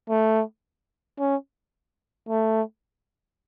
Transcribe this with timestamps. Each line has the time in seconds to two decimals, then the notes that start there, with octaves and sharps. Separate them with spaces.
0.10 A3
1.19 C#4
2.29 A3